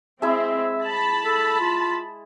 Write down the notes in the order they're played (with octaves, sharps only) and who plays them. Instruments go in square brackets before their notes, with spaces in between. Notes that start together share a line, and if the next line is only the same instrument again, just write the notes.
[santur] G#3 E4 [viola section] C4 [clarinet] E5
[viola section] A5 B5
[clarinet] A4
F4